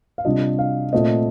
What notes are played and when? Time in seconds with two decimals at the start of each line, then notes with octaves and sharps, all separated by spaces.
0.18 F5
0.25 C3 G3 D4 F4 D#5
0.59 F5
0.93 A#2 A3 C4 D#5